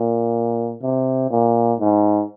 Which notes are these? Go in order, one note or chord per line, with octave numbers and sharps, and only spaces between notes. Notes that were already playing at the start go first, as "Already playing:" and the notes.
Already playing: A#2
C3
A#2
G#2